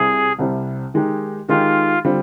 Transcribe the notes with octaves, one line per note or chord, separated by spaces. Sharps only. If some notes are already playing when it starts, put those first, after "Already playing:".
Already playing: C2 C3 G3 G#4
C2 C3 G3
D#3 G#3 D#4 G4
D#3 G#3 D#4 F4 G4
D3 G3 C4 F4